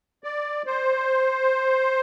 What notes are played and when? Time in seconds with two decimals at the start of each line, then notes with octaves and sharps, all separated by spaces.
0.24 D5
0.66 C5